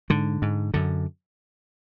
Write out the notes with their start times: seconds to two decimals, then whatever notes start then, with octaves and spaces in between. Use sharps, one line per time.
0.10 G#2 D3
0.42 G#2
0.74 F#2 D3